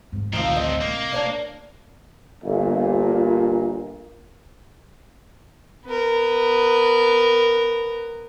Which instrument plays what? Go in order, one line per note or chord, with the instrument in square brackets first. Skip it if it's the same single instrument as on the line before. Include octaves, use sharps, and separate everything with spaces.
[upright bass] G#2 D3
[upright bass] A1 D2 [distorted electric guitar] G2 C4 [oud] D#3 F3
[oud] D#5
[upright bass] C2 [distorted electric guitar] A#3
[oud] D4 C#5 D5
[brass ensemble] G1 A#2
[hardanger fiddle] B3 A#4